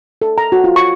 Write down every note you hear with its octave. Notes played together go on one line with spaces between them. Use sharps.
A4
A#5
F#4
F4
C#6